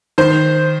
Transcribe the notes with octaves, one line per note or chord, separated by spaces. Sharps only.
D#3 C5